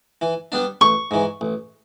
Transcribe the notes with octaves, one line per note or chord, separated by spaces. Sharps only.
E3
G3 B3 D4
A1 C#6
G#2 E3
A1